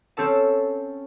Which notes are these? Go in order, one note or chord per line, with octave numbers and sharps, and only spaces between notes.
C4 C#4 A4 A5